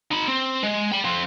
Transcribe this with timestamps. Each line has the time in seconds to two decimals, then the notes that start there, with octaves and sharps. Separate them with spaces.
0.12 D#4 B5
0.28 C4
0.63 G#3
0.92 G5 B5
1.04 F3 C4